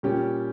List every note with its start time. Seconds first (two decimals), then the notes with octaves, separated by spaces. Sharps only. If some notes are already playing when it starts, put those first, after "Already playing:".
0.03 A#2 G3 C#4 G4